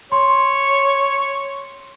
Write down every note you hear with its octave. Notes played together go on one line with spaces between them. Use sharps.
C#5 C6